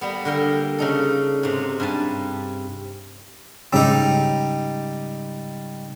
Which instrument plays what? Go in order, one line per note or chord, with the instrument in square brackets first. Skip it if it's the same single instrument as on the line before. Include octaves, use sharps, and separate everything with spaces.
[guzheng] G3 A#3 B3
D3 A#3 A#4 G5
C#3 D#4 A4
G#2 C3
G2 G#5 A5
[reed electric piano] G#2 C#3 E6 [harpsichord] G3 D#4